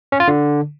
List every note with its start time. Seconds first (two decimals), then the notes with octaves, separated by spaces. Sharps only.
0.12 C#4
0.20 F4
0.28 D3